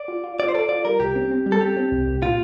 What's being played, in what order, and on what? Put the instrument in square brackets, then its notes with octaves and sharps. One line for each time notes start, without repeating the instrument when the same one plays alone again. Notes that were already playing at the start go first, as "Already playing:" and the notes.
Already playing: [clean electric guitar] D5
[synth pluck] F4
F4
[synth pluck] F4 [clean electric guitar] D5
[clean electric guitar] C5
[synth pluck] A4 [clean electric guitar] D5
[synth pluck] F4 [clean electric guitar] D5
[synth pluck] G3 [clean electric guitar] A#4
[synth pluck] C2 [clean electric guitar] G4
[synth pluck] C4
C4
G3
[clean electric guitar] A4
[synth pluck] C4 [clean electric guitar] G4
[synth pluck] C4
C2
C2
[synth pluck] A#2 [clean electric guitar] F4